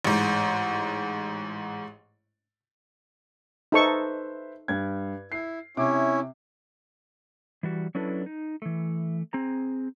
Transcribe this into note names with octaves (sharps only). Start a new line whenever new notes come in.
A1 G#2
D#4 A4 B4 C5 E5 C#6
G2 G#6
E4 C7
C3 C#4 E4 D6
E3 G3 F#4
F#3 C#4 D4 E4 A4 B4
D#4
E3 A3
C4 G#4 A#5